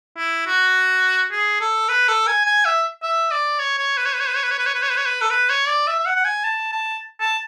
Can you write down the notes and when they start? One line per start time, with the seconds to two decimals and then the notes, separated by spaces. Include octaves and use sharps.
0.17 E4
0.47 F#4
1.31 G#4
1.61 A4
1.89 B4
2.08 A4
2.27 G#5
2.46 G#5
2.65 E5
3.02 E5
3.31 D5
3.59 C#5
3.78 C#5
3.97 B4
4.06 C#5
4.13 B4
4.20 C#5
4.28 B4
4.36 C#5
4.43 B4
4.51 C#5
4.58 B4
4.66 C#5
4.75 B4
4.83 C#5
4.90 B4
4.98 C#5
5.05 B4
5.21 A4
5.30 B4
5.50 C#5
5.68 D5
5.87 E5
6.00 E5
6.06 F#5
6.16 F#5
6.25 G#5
6.44 A5
6.72 A5
7.20 A5